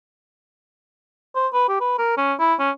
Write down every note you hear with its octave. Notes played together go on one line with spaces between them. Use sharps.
C5
B4
G4
B4
A#4
C#4
E4
C#4